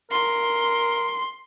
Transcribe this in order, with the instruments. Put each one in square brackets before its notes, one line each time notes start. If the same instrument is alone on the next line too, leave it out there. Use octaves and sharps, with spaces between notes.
[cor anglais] A#4 [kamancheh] C6